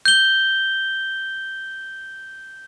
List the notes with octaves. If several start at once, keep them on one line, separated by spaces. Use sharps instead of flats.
G6 G7